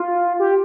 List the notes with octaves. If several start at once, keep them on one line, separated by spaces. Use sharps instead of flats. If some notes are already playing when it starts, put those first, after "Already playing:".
Already playing: F4
G4